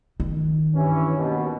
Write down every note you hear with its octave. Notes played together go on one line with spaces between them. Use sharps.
D#3
G2 E3 C#4
D#2 B2